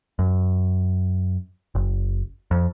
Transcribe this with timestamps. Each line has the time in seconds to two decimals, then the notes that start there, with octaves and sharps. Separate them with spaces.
0.19 F#2
1.75 F#1
2.51 F2